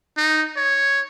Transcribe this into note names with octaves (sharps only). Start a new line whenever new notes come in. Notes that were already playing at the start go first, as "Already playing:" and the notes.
D#4
C#5